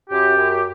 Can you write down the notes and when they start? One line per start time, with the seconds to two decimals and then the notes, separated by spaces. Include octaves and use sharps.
0.10 F#2 G4
0.36 F#2
0.50 G4